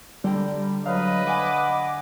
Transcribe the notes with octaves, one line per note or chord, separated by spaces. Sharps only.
D3 G3 G5 A#5
F#3 B4 D#5 F5
F#5 G#5 D6